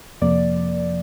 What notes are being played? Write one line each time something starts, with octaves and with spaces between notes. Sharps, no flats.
F2 C3 F3 A#3 D5